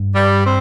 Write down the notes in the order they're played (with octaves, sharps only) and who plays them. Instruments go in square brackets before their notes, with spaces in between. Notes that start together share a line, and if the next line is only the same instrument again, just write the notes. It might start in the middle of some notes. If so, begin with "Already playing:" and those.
Already playing: [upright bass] G2
[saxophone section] G3
C4